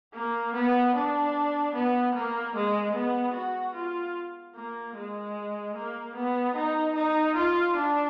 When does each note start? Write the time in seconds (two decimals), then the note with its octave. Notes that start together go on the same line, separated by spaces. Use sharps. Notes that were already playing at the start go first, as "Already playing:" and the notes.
0.14 A#3
0.55 B3
0.95 D4
1.75 B3
2.15 A#3
2.55 G#3
2.94 B3
3.35 F#4
3.75 F4
4.56 A#3
4.96 G#3
5.76 A#3
6.15 B3
6.55 D#4
6.95 D#4
7.35 F4
7.76 D4